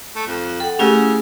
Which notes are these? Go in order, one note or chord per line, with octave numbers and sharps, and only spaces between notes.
A3
F2
A4 F#5 G5
C#3 A3 C#4 E4 G4 G#4 E6